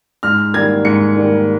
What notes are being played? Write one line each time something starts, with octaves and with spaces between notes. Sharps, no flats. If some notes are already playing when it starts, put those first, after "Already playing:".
G#2 F6
D#3 G3 A#3 G#6
G#2 C#7
D#3 G3 A#3